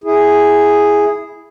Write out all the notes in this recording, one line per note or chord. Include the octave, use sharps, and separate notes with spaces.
E4 G#4